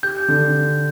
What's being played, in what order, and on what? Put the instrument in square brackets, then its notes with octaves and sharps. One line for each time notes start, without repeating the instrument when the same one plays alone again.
[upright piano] G4 [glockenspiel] G6
[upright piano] D3